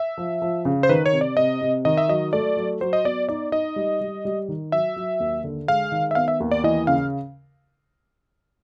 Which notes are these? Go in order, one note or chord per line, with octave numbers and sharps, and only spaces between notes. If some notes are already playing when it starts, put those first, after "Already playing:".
Already playing: E5
F3
F3
C#3
C5
D#3 B4
C#5
C3
D5
C3 D#5
C3
D#3 D#5
E5
F#3 D#5
A3 D5
F#3
F#3 C5
D#5
B3 D5
D#4 D5
D#4 D#5
G3
G3
G3
D#3
F#3 E5
F#3
D#2
D3
G#3 F5
D#3
E5
B3 F5
E5
D#2
D5
E3 D#5
C#3 F5